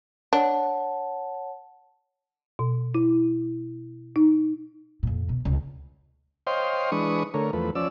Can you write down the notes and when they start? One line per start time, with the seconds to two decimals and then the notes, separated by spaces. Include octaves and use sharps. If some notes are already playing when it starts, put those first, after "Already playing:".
0.33 D4 C#5 F#5 A5
2.59 B2
2.95 E4
4.16 D#4
5.03 F2 A#2
5.29 B2
5.45 C#2
6.47 C5 C#5 D#5 F5 G5 C6
6.92 E3 G#3 D4 B4 C#6 D#6
7.34 D3 A3 A#4 C#5
7.53 E2 F3 A3 B4
7.75 F3 C#4 D5 E6